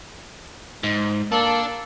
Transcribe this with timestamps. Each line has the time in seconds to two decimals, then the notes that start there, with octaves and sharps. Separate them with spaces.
0.83 G#2
1.32 A#3 D4 A4